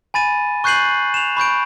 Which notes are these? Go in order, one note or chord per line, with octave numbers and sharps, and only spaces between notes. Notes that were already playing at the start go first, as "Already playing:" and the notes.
G#5 B5 A6 D#7
C#6 F#6 G6 C7 D#7 F#7
E7 F7
B5 C#6 G6 D7